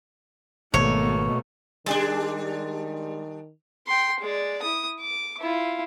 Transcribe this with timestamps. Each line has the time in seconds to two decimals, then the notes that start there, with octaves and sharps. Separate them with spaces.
0.74 G#1 B2 A3 A#3 C#5
1.86 D#3 G3 G#3 D4 D5 A5
3.88 G5 C6
4.20 G#3 D5
4.63 E4 D#6
5.01 D6
5.39 E4 F4